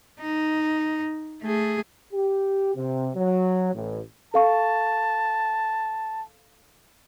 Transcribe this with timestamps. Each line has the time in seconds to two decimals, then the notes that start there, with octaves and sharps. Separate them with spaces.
0.22 D#4
1.43 A3 G#4
2.13 G4
2.75 C3
3.15 F#3
3.73 A1
4.34 A4 F5 A5 C#6